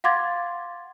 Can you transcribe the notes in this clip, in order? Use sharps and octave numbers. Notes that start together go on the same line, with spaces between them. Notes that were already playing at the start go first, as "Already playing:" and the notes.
F5 F#5 C6 D6 G#6 A6